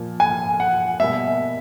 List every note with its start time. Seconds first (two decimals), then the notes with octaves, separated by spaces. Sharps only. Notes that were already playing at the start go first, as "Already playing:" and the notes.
Already playing: A#2 F3 A#3
0.20 G#5
0.60 F#5
1.00 B2 G3 A#3 E5